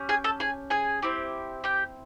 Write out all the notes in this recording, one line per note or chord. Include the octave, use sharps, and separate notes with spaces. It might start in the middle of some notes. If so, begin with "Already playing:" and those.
Already playing: C#4 G4
G#4 G#5
A4 A5
G#4 G#5
G#4 G#5
C4 E4 G4
G4 G5